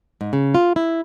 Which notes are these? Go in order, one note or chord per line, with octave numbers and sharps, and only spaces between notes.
G#2
C#3
F4
E4